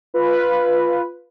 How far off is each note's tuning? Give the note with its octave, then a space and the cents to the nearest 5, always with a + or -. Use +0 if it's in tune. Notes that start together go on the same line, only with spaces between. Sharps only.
F4 +0 B4 +0